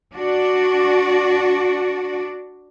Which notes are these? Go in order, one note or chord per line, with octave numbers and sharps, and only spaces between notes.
D4 F#4 D5